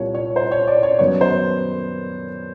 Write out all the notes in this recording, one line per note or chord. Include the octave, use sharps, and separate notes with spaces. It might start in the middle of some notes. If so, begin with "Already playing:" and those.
Already playing: C2 A#2 G3 C#5
C#5
C5
C#5
D5
C#5
F#2 D#3 F#3 B3 C#5
C5